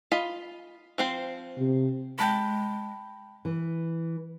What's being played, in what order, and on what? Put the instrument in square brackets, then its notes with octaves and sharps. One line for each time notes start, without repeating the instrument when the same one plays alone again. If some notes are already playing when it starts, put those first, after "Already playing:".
[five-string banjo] F4 D#5 B5
F3 C4 C5
[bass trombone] C3
[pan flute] G#3 [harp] G5 A5 B5
[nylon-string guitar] E3